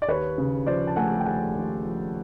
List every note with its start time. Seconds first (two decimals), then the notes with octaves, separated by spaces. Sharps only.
0.02 D5
0.08 D#2 B4 C#5
0.38 C#3
0.67 F3 C5 D5
0.87 A5
0.96 A3 F#5 G#5
1.20 G5
1.26 D#2 F#5 G#5
1.56 D#2
1.85 F3